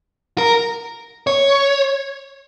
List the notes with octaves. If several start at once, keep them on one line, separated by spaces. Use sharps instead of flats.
A#4
C#5